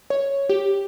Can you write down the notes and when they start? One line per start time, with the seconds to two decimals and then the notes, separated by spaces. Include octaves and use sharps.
0.10 C#5
0.49 G4